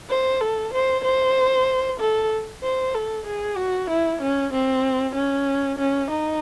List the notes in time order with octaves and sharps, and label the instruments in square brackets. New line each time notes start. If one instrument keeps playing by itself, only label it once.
[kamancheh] C5
A4
C5
C5
A4
C5
A4
G#4
F#4
E4
C#4
C4
C#4
C#4
D#4